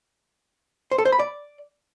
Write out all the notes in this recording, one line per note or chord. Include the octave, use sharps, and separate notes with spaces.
C5
A4
C5
B5
D5